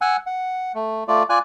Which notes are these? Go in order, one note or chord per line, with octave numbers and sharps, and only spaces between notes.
F#5 G#5 E6 F#6
F#5
A3
A3 F4 D5
F4 D5 G#5 F#6